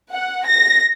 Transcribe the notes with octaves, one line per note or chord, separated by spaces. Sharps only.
F#5
A#6